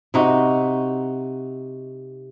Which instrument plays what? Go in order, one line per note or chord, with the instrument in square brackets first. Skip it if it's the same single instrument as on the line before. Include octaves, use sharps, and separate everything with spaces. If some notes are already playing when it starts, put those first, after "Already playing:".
[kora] C3 D#4 F#4